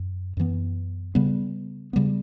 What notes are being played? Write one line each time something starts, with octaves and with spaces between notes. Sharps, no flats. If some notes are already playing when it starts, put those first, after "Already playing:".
Already playing: F#2
F#2 E3 B3
C#3 G3 B3
C#3 G3 B3